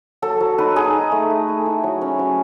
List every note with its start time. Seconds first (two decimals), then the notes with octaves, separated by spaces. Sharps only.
0.22 F#3 A4
0.40 F#3
0.58 D#4 B4
0.76 D#4 G#4
0.94 D#4
1.12 A3
1.30 A3
1.48 A3
1.66 E4
1.84 F#3
2.01 C#4
2.19 F#3